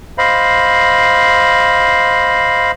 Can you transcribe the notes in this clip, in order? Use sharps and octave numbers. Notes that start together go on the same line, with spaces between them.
C5 D#5 F5 B5